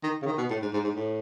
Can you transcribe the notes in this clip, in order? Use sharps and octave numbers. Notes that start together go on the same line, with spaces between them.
D#3
C#3
D#3
B2
A2
G#2
G#2
G#2
A2